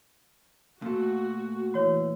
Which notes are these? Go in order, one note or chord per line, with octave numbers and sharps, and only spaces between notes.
A#2 A3 F#4
E3 F#4 C#5